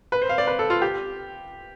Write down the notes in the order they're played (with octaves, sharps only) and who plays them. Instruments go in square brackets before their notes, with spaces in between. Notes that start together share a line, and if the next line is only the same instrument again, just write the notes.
[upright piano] B4
C5
F5
D5
B4
A4
F4
G4